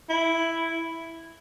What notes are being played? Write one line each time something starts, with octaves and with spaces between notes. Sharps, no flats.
E4